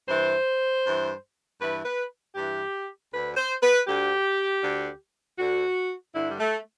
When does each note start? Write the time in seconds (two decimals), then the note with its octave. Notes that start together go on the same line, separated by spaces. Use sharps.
0.09 G2 E3 C5
0.85 G2 E3
1.60 G2 E3 B4
1.85 B4
2.35 G2 E3 G4
3.12 D2 D3 B4
3.37 C5
3.63 B4
3.88 D2 D3 G4
4.63 D2 D3
5.39 D2 D3 F#4
6.14 G2 D3 E4
6.29 G3
6.40 A3